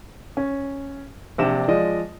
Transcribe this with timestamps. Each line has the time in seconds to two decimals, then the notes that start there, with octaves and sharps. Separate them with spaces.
0.37 C#4
1.38 A#1 C3 D4 D5 E7
1.68 F3 G#3 D5 D#5